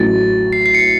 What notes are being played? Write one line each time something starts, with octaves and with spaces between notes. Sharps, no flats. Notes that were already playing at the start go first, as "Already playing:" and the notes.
Already playing: A1 A2 F#3 A6
C7
C7
C#7
C7